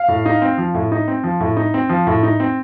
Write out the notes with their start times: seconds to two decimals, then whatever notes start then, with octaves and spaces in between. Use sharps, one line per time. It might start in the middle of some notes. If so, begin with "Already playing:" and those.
Already playing: F5
0.08 A2
0.26 D#4
0.42 C4
0.58 F3
0.74 A2
0.92 D#4
1.08 C4
1.24 F3
1.40 A2
1.57 D#4
1.74 C4
1.89 F3
2.07 A2
2.23 D#4
2.40 C4